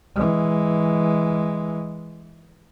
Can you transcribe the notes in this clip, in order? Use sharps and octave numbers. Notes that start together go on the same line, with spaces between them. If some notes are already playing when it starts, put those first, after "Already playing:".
E3 G#3